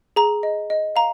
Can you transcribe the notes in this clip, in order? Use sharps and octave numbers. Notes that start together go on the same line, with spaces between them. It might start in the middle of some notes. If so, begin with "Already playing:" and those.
G#4 A#5
D#5
D#5
F5 A#5